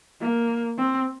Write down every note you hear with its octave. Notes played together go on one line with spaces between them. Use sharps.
A#3
C4